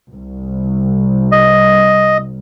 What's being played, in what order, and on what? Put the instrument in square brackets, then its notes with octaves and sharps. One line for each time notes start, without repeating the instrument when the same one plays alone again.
[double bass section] C2
[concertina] D#5